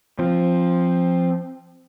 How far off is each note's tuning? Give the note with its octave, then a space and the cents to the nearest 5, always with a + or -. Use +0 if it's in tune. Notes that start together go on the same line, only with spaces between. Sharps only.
F3 +0 C4 +10